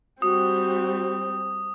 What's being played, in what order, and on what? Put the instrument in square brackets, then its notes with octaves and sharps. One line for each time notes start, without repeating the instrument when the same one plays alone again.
[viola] G3 C4 [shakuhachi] F#4 [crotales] D#6